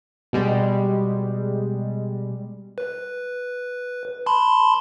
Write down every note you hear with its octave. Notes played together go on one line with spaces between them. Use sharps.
B2 G3 G#3
B4
A5 B5 C6